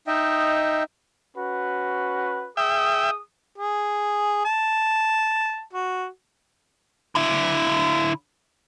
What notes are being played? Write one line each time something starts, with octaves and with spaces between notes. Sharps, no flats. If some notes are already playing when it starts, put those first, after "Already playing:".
D#4 D#5 E5 G5
C#4 F#4 B4
G#4 E5 G5 D#6
G#4
A5
F#4
D3 E4